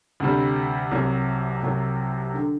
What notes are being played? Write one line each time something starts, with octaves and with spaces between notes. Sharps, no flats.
D2 C3 G3
C2 C3 F#3
C2 C3 F#3
D3